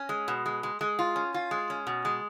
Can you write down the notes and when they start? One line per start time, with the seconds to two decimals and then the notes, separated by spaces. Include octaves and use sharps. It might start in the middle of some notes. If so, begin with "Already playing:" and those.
Already playing: C#4
0.09 G#3
0.28 B2
0.46 G#3
0.63 G#3
0.81 G#3
0.99 F4
1.16 C#4
1.34 F4
1.51 G#3
1.70 C#4
1.87 B2
2.05 G#3